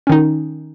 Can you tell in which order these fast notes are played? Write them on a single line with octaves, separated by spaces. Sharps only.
C#4 D#3 D#4